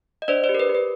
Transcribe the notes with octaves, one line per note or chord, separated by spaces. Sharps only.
D#5
D4 C5 D5
C5 D5
G4
A#4
B4
G4
B4